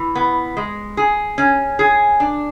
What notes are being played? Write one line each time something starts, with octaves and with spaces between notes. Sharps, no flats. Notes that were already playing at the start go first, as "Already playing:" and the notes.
Already playing: E3
B3
G#3
G#4
C#4
G#4
D4